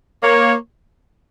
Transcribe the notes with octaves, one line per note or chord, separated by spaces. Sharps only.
A#3 C#5